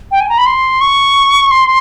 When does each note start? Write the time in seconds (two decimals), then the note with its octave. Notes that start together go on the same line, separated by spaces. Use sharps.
0.11 G5
0.21 G#5
0.29 A#5
0.38 B5
0.46 C6
0.81 C#6
1.51 C6